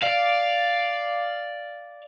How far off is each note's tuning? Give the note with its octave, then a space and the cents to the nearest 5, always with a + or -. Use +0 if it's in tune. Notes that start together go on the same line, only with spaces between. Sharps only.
D5 +0 F5 +0